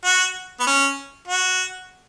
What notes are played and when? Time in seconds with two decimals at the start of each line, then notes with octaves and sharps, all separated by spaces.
0.05 F#4
0.60 B3
0.67 C#4
1.28 F#4